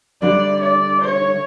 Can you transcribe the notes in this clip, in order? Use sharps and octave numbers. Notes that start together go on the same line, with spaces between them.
D3 G3 D4 D5
D5
C#5